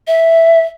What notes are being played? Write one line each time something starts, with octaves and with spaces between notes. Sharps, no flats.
E5